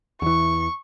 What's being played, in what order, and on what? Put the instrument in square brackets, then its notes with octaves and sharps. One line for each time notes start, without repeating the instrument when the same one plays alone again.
[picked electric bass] E2 E3 [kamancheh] C#6